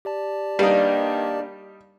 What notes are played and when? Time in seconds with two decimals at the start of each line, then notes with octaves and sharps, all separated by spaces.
0.05 G4 D5 A5
0.59 D#3 G3 A#3 D4 D#4 B4